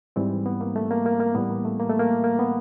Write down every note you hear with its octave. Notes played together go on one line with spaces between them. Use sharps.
G#2 E3 G3 C4
B3
A#3
A3
A#3
A#3
A#3
A2 E3 G3 B3
A#3
A3
A#3
A3
A#3
A#3
B3